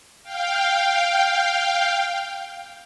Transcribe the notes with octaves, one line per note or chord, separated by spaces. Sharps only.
F5 G5